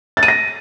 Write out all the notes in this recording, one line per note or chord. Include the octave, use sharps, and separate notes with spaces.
A6
D#7
A#6